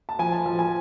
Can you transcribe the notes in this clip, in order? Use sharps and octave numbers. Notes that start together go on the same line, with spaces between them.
A5
F3 G#5
A5
F3 A5
G#5